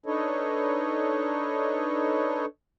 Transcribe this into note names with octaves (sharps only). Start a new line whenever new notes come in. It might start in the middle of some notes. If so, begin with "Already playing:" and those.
D4 D#4 A4 B4 C#5 D#5